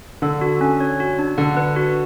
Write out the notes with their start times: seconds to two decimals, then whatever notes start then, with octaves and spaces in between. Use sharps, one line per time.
0.22 D3 A4
0.41 F#4
0.61 C#4
0.80 C#5
1.00 F#4
1.19 D4
1.38 D3 F#5
1.57 B4
1.76 F#4